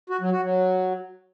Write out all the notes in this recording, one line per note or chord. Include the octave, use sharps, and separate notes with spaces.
F#4
F#3
F#4
F#3